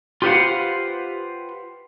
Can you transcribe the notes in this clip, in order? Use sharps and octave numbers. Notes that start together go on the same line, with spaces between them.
F4 G4 B4 C5 F5 F#5